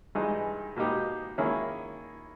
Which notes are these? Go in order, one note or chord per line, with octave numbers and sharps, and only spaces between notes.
G2 E3 G#3 D#4
B2 A#3 D#4 G4
D#3 A#3 C#4 E4 G#4